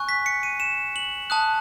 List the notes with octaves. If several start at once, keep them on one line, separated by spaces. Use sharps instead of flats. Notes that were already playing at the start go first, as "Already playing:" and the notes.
Already playing: G#5 C#6 F#6
B6
C#7
D#7
E7
F#7
A5 D#6 F#6